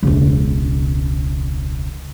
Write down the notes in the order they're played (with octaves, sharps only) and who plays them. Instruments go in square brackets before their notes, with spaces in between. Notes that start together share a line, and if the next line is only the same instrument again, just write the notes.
[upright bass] E1 C#2